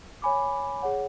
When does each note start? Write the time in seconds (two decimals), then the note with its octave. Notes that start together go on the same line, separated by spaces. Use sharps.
0.22 C#5 G#5 B5 D6
0.82 G#4 C#5 F#5